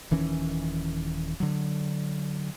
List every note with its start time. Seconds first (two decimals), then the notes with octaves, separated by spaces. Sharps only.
0.11 D#1 D#3 E3 C#4
1.40 D3 F#3